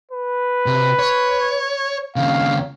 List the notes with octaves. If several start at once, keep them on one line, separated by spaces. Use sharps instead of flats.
B4
C3
C#5
D#2 C#3 F5